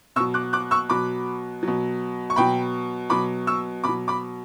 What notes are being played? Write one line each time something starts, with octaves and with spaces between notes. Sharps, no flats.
B2 F#3 C#6 E6
D6 F#6
D6 F#6
C#6 E6
B2 F#3 B5 D6
B2 F#3
C#6
B2 F#3 G5 B5
B2 F#3 B5 D6
C#6 E6
B2 B5 D6
F#3
B5 D6